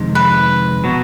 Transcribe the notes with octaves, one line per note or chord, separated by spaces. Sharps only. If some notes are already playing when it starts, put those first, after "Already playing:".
Already playing: F2 C3 D#3 G#3
B4
B2 F#3 B3